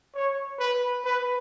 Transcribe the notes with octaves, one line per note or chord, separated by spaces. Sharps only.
C#5
B4
B4